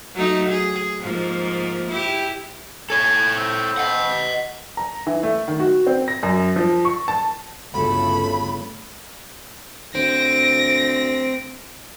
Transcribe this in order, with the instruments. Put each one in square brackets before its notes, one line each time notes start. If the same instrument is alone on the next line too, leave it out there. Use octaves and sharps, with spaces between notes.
[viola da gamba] F#3 A3 D#4
G#4
G#2 F3 A#3
E4 G4
[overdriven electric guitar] A4 C#5 [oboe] G#5
[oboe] C4
[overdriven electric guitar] D#5 F#5
[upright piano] A#5
E3
A3
D#3
F#4
C4
A#6
F#2
F3
C#6
A5
[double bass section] G1 C#3 A3 [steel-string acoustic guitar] D2 A4 [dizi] B5
[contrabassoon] D2 [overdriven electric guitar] C4 [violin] A#6 [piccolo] D7